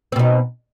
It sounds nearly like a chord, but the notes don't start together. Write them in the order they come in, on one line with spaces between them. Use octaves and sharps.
C4 B2 D#4